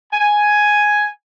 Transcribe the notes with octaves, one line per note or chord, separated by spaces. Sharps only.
G#5